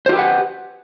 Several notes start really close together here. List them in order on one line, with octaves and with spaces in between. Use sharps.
C5 F4 G4 B4 F#5